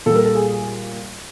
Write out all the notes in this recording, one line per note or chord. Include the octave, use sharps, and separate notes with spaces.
A#2 G3 A4
A#4
A4
G#4